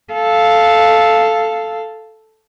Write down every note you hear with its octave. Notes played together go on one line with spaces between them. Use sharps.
A4 F5